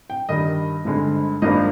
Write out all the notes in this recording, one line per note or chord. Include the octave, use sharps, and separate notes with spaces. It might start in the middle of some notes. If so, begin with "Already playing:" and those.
G5
G2 D#3 G3 D#5
G#1 G2 D3 G#3
G#1 G2 F3 A#3 D4 D#5